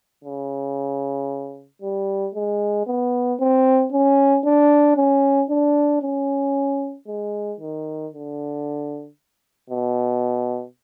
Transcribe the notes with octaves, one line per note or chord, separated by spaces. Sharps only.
C#3
G3
G#3
B3
C4
C#4
D4
C#4
D4
C#4
G#3
D#3
D3
B2